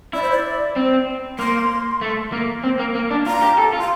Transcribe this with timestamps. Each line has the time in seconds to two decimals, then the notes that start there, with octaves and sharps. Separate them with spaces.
0.13 E4 D5
0.22 C5
0.31 D5
0.76 C4
1.39 A#3 C6
2.01 A3
2.32 A#3
2.64 C4
2.79 A#3
2.95 A#3
3.11 D4
3.26 F4 A#5
3.42 G4
3.58 A4
3.73 F4
3.81 C6